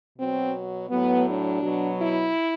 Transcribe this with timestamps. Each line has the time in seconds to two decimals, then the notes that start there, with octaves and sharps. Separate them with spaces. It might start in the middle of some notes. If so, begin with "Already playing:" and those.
0.18 B2 F#3 C4
0.90 A2 F#3 B3
1.26 D4
1.61 B2 F#3
1.98 E4